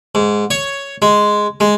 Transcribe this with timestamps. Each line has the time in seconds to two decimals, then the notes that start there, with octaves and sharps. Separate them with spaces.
0.15 G#2
0.51 C#5
1.02 G#3
1.60 G#3